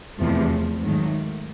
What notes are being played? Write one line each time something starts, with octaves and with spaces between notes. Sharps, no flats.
E2 C3 F3 A3
G#2 D#3 F#3 A3